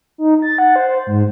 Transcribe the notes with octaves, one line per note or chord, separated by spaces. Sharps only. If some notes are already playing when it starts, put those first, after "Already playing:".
D#4
A6
F#5
C5
G#2